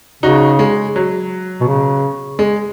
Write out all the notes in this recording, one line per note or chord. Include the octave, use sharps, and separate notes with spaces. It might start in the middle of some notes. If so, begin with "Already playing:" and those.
C#3 D#4 F#4
G#3
F#3
B2
C#3
G#3